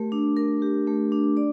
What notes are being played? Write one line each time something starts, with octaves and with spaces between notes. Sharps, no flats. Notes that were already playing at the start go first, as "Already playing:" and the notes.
Already playing: A3 G4 A#4
D4
A#4
G4
A3
D4
D5